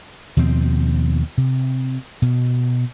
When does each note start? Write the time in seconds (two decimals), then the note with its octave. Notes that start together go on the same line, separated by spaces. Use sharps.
0.37 D#2 B2 F3 C4
1.38 C3
2.22 B2